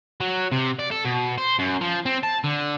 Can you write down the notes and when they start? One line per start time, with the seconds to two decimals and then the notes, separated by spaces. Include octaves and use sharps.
0.21 F#3
0.52 C3
0.79 D5
0.91 A4
1.05 B2
1.38 C5
1.59 F#2
1.81 F3
2.06 C4
2.23 A5
2.44 D3